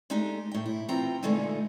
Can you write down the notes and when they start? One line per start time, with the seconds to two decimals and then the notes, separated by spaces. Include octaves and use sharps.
0.10 G#3 A3 D4 D#4 G4
0.52 A2 G5
0.66 E4
0.88 E3 C4 F4 G5 A#5
1.23 G2 A#2 D3 G#3 A3 D#4